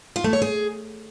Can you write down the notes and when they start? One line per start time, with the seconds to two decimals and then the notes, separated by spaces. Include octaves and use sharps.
0.16 F4
0.24 A3
0.33 C#5
0.42 G#4